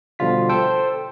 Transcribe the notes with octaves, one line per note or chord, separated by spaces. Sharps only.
B2 D3 F3 G3 F4 B6
A4 C5 G5